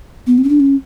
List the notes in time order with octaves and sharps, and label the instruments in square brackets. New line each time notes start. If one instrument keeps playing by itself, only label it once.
[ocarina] B3
C4
C#4
D4
C#4